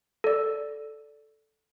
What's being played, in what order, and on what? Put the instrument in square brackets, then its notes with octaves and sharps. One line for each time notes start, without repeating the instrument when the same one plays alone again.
[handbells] A4 D5